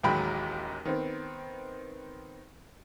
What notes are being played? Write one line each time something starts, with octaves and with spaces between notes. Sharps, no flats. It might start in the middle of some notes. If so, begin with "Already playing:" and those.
A1 D#2 F#3 G#3 G5 B5
D#3 B3 C4